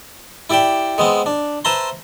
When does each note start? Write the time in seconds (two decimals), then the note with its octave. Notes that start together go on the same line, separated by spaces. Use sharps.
0.50 E4 G4 D5 E5 G5
0.98 G#3 B3 C4
1.26 D4
1.65 B4 C5 E5 A5 A#5 C6